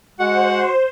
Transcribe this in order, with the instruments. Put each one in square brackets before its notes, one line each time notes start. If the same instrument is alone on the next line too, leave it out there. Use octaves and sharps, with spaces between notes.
[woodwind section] G#3 F#5 [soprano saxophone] F#4 [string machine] C5